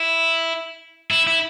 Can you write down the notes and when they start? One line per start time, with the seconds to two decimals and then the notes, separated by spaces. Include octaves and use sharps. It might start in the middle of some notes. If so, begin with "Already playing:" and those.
Already playing: E4
1.11 E4
1.27 E4